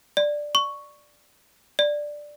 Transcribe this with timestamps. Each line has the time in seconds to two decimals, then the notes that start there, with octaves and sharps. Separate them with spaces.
0.17 D5
0.55 C#6
1.79 D5